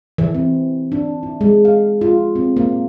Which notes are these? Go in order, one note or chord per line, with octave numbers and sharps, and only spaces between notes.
E3
C4
D4
E4
G#3
F5
F4
C4
A#3